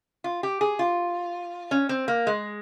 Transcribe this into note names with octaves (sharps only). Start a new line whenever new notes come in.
F4
G4
G#4
F4
C#4
C4
A#3
G#3